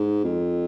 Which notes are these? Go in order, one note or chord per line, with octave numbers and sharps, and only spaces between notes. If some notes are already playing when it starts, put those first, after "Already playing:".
Already playing: G#2
F2